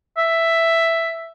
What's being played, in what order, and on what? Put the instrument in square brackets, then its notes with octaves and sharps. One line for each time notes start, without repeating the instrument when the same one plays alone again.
[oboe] E5